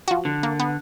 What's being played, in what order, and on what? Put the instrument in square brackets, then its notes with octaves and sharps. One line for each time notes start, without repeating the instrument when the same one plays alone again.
[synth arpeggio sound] F3 F#4
[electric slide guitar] D3
[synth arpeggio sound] A#3
B3